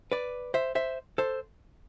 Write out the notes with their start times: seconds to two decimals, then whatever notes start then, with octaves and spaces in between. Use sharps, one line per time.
0.12 B4 D5
0.54 C5 E5
0.75 C5 E5
1.18 A4 C5